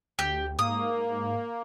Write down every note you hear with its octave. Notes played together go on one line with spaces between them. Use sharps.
D2 G4
G#2 A#3 D#6